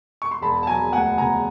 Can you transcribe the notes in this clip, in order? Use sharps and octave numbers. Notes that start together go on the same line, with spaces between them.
C#6
C6
E1 A5 B5
A5
F#3 G#5 A#5
D2 F#5 G#5
C#3 G#5 A#5